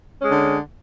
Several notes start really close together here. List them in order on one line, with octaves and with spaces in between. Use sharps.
C#4 G#3 D3